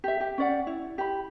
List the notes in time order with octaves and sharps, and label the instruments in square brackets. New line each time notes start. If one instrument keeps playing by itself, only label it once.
[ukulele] G4 E5
G4
C#4 D5 F#5
E4
G4 B5